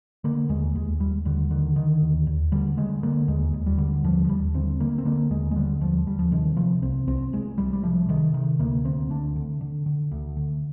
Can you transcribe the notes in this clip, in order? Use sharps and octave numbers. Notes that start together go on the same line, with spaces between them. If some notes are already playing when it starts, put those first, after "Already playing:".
D3 A#3
D#2 G#3
D#2 G#3
D#2 G3
D#2 D3
D3 D#3
D3 D#3
D#2
D#2
D3 G3
D3 G#3
D3 A#3
D#2 G#3
D#2
G3
D3
D#2 F3
F3
D#2 G3
D3 C4
D3 A#3
C4
D3 A#3
D#2 G#3
G#3
D3 G3
D#2 F3
D#2 G3
F3
C3 D#3
C3 F3
C2 C4
C2 C4
C2 G#3
C2 G3
G3
C3 F3
C3 D#3
C3 D#3
D2 A#3
D2 C4
D2 D4
D3
D3
D3
D2
D3